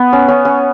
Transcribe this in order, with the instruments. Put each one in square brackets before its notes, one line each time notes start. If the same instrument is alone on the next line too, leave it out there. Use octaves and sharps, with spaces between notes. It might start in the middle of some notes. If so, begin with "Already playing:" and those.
Already playing: [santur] B3
C#4
C#4
C#4